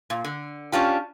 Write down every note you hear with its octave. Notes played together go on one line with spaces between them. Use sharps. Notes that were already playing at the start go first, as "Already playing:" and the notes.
A#2
D3
C#4 D4 F4 G4